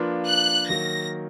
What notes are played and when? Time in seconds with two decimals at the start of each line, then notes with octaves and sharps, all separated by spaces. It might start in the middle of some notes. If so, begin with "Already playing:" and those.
Already playing: F3 A#3 D4 F4 B4
0.26 F#6
0.68 D#3 F#3 A#3 A#6